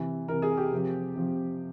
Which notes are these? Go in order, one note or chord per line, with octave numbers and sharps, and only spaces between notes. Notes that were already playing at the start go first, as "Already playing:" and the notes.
Already playing: C3 E3
C3 E3 A#4
G#4
G4
C3 F3
C3 F3